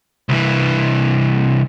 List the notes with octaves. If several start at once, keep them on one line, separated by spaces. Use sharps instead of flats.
C2 E3